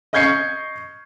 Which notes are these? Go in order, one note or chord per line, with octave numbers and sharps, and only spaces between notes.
D#5 C#6 G6 G#6 C7 C#7